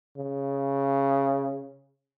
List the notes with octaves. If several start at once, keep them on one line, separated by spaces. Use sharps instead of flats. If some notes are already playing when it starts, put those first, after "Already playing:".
C#3